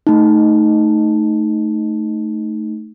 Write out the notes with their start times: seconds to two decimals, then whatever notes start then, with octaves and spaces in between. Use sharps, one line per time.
0.07 A3 D#4